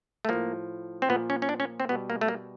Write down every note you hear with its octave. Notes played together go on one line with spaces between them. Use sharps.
A3
A2 F3 A#3
C4
A#2 F3 B3
C#4
C#4
D4
C#4
C4
B2 G3 B3
A#3
A3
A#3